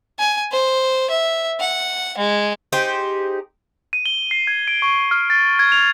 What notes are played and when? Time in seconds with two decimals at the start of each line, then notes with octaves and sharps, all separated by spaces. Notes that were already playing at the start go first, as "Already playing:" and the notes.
0.19 G#5
0.52 C5
1.10 E5
1.60 F#5
2.18 G#3
2.72 D#4 G4 G#4 C5
3.93 D#7
4.06 G7
4.31 C7
4.47 G#6
4.68 D7
4.82 C#6
5.11 F6
5.30 A6
5.59 G#6
5.72 F7